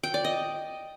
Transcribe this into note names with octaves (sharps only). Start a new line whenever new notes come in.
G5
D5
D#5